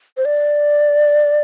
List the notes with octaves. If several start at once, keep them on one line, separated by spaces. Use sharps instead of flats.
C5
D5